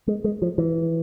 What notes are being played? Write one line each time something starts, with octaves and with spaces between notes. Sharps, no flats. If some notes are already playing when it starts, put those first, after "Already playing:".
G#3
G#3
F3
E3